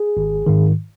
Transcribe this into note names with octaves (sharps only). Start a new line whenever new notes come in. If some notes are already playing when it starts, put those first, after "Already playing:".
Already playing: G#4
G#1
G#2 D#3